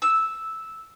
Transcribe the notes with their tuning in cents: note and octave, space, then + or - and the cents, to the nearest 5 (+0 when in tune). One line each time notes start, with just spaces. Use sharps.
E6 -5